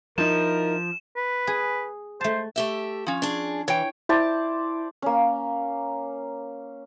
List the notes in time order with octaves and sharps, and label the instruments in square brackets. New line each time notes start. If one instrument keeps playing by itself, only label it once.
[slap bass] F3 [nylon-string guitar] D#4 E4 [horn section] A#4 [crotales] E7
[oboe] B4
[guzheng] G#4
[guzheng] A3 A5 [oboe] C5
[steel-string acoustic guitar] A3 G4 E5
[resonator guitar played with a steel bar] F3 C#4
[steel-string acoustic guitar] D4 G#4
[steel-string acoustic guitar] E3 [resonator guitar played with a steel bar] C#5 G5
[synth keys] E4 [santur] C5 D5 A5
[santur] A#3 C#4